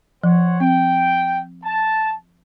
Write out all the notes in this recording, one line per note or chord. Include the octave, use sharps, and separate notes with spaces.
F3 C5 C#5 F#5
C4 G5
A5